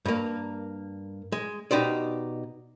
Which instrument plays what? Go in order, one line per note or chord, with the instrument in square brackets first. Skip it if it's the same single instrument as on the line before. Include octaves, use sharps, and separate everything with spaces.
[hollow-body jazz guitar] G2 A#3
G#3
B2 D#4 G4 C5 D5